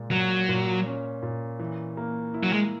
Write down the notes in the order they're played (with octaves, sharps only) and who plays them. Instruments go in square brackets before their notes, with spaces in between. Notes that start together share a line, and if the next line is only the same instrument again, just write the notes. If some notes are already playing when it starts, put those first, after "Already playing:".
Already playing: [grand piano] A#2 G#3
[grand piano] A#2 [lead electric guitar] F#3
[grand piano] A#2
C#4
A#2
E3
A#3
E4
[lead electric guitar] F#3
G#3